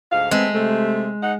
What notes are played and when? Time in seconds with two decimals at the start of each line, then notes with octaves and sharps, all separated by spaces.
0.12 D2 G#2 F5
0.31 G#3 A3 B3 C4
0.54 C3 A3
1.23 G#3 D#4 F#5